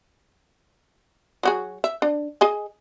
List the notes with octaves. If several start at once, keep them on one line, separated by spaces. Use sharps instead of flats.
F#3 F#4 G#4
E5
D4
G#4 D#5 G#5